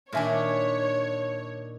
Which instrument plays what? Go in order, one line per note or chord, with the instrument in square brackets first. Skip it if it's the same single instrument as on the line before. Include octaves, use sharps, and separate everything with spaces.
[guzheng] A#2 D#3 D4 [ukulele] A#4 E5 G#5 [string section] C#5